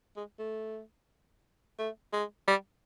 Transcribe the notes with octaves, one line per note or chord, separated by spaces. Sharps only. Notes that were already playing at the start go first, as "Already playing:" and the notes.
G#3
A3
A3
G#3
G3